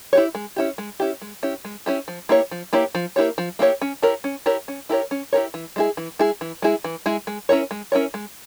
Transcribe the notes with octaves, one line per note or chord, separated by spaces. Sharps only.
E4 G4 C#5
G#3
C#4 E4 G4
G#3
C#4 E4 G4
G#3
C#4 E4 G4
G#3
C#4 E4 G4
F3
A#3 E4 G4 C#5
F3
A#3 E4 G4 C#5
F3
A#3 E4 G4 C#5
F3
A#3 E4 G4 C#5
C#4
E4 G4 A#4 C#5
C#4
E4 G4 A#4 C#5
C#4
E4 G4 A#4 C#5
C#4
E4 G4 A#4 C#5
E3
G#3 E4 G#4
E3
G#3 E4 G#4
E3
G#3 E4 G#4
E3
G#3 E4 G#4
G#3
C#4 E4 A#4 C#5
G#3
C#4 E4 A#4 C#5
G#3